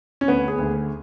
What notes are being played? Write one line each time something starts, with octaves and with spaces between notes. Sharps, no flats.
C#4
D2 B3
G#4
D2